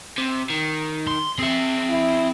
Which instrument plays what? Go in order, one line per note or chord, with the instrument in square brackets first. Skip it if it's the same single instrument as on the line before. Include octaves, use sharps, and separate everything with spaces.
[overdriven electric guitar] C3
D#3
[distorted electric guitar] C6
[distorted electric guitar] C4 [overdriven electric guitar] G#4 E5
[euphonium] E4